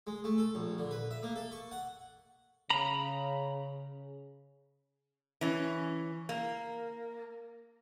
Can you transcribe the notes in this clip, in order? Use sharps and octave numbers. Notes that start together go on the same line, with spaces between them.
G#3
A3
A4
A#1
D3
B4
E5
A#3
A4
C#6
F#5
C#3 A#5 B5
E3 C#4
A#3